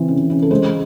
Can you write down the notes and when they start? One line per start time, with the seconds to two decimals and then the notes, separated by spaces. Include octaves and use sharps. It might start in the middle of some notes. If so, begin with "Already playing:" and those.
Already playing: E3 C4
0.08 C#3
0.30 C#3
0.42 A4
0.51 G#3 C5